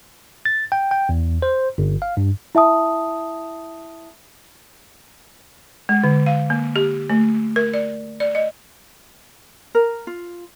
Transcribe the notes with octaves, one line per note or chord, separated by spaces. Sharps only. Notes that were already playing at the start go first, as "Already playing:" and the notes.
A6
G5
G5
E2
C5
G1
F5
G2
E4 E5 A5 D#6
G#3
D3
F5
A#3
G4
A3
A#4
D5
D5
D#5
A#4
F4